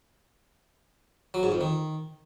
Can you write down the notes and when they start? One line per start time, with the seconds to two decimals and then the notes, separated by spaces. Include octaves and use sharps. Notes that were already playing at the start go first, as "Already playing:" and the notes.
1.34 F#3
1.43 G#2
1.52 F2
1.61 D#3